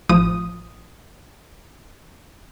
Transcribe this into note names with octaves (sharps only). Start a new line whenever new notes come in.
A1 F3 D#6